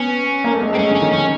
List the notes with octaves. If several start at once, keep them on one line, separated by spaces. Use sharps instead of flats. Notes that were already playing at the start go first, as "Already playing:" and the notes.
Already playing: B3 C#4
A#3
A3
G#3
A3
C4
G#3 C#4
D3
C#4
D#3
D#3 C#4